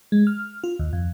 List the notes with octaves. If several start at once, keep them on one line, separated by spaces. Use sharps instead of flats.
G#3
F6
F4
D#2
F2